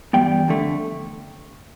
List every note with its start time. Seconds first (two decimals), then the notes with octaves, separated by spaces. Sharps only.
0.13 G2 E3 G3 B3 G5
0.48 F2 D3 A3